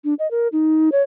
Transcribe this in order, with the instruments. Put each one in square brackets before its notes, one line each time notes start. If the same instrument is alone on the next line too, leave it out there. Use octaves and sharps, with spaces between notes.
[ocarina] D4
D#5
A#4
D#4
C#5